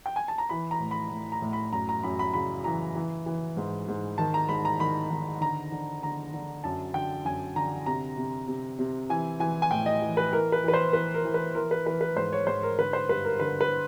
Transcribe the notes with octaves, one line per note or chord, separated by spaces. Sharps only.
G5
G#5
A5
A#5
E3 B5
A#5
A2
B5
A2
A#5
A2
B5
F#2 A#5
A#5
F#2 B5
B5
C#3 B5
E3 A#5
E3
E3
G#2
G#2
D#3 A5
A#5
G#2 B5
A#5
D#3 B5
D#3
D3 A#5
D3
D3 A#5
D3
F#2 A5
D3 G5
F#2 G#5
D3 A#5
C3 A#5
C3
C3
C3
E3 G#5
E3 G#5
G#5
A2 G5
D#5
E3
B4
E3 A#4
B4
E3 B4
C5
E3 B4
A#4
E3
B4
E3 A#4
B4
E3 B4
B4
G#2 C5
C#5
G#2 C5
A#4
D3 B4
C5
G2 B4
A#4
D3 B4
B4